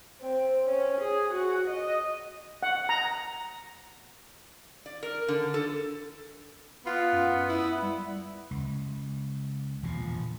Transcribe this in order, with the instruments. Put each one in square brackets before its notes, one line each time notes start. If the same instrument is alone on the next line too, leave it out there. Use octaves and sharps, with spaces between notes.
[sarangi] C4
C#4
G#4
F#4
D#5
[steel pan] F#5
A#5
[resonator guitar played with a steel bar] D5
A#4
D3
A4
[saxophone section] B3 [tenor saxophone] F4
[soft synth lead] F#2
[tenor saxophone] E4
[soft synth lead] G3 [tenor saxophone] E4
[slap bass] C#2
E1 A#1 A#2 F3